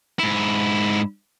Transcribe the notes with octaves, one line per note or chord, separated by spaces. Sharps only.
G#2 E4